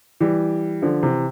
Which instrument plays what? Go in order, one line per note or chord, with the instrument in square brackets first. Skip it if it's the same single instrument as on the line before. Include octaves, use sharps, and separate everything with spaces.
[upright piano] E3 G3
D3 F3
C3 E3